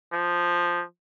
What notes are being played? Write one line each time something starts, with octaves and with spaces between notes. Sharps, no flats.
F3